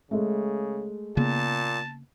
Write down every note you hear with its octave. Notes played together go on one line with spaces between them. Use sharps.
C#3 G#3 A3
A#2 C#3 A#3 B3 A5